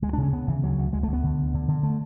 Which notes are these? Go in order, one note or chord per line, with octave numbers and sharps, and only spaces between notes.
D2 G#3
D4
C#3
C#4
C#3 B3
C#3 E3
D2 F#3
D2
D2 G#3
A3
D2
B3
D3
D2
D3
D3
A3